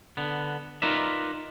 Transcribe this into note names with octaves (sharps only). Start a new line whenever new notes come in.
D3 B3
D#4 F4 A#4 B4 D5 E5